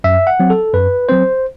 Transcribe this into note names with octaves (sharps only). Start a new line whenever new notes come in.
F#2 E5
F#5
F#3 C4
A4
F#2 B4
F#3 C4 C5